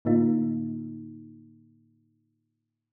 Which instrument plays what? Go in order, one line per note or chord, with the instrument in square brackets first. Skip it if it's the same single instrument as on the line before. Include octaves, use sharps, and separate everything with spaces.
[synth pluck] A2 D3 A#3 D#4 F4